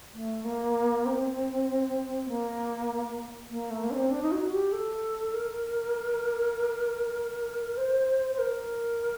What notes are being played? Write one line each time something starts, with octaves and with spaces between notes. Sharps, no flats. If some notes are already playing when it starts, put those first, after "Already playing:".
A3
A#3
C4
A#3
A#3
A3
A#3
D4
C4
D4
D#4
F#4
G4
A4
A#4
C5
C5
A#4